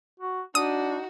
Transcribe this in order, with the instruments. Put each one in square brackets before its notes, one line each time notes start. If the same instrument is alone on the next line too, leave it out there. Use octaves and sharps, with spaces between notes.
[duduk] F#4
[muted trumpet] D4 [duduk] D#4 [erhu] F#4 [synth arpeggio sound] D#6